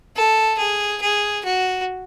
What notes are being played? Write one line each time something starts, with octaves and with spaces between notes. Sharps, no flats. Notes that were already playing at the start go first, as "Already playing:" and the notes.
A4
G#4
G#4
F#4